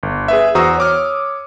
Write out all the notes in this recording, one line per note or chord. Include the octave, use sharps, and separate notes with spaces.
G1
G#4 B4 E5
E2 F#4 C5 A#5 D#6 E6
C#5 D6 F6